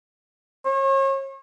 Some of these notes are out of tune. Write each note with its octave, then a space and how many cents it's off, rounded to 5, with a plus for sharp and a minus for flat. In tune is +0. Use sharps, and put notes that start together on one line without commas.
C#5 -40